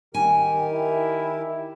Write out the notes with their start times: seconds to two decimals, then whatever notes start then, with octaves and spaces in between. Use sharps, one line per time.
0.15 D#3 G4 A#4 G#5
0.72 E4